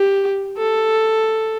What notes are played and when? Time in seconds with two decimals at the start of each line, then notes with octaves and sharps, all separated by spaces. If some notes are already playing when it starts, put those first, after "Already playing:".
Already playing: G4
0.57 A4